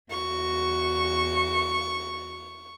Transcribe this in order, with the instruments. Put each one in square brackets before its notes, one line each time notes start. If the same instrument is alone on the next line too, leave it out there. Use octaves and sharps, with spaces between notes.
[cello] E2 F#4 [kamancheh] C#6